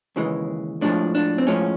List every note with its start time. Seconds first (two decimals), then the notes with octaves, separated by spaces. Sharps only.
0.16 D#2 C#3 E3 G#3
0.81 A2 F3 G#3 D4
1.15 D4
1.38 C4
1.47 A2 F3 G#3 C#4